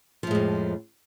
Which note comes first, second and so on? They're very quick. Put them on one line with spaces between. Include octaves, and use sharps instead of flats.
F3 A2 G#3 F2